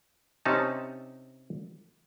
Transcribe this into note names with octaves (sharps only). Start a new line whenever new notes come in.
C3 C#4 D#4 A5